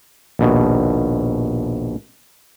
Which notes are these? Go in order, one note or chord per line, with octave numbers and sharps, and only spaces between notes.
A#1 D#2 B2